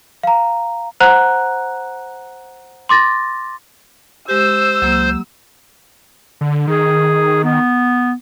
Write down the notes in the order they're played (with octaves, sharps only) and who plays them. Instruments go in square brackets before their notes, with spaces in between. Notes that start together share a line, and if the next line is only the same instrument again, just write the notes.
[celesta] F5 A#5
C5 F#5 A#5 F#6
C6 D6 A6 A#6
[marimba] G#3 G4 [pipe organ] C5 [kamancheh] E6
[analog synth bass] C#2 [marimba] F#3 A#3
[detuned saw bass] D3
[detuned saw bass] D#3 [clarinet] G#4
[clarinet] B3